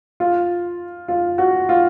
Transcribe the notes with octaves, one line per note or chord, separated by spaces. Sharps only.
F4
F4
F#4
F4